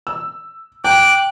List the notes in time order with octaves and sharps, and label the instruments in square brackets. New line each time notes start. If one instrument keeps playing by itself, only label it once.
[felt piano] E6
[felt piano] G5 [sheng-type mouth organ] D6 F#6